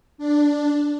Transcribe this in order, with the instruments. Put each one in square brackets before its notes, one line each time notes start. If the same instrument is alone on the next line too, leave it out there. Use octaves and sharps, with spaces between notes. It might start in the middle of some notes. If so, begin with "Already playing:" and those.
[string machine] D4